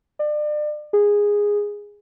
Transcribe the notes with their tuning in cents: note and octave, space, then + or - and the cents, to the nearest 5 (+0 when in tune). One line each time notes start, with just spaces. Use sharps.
D5 +35
G#4 -10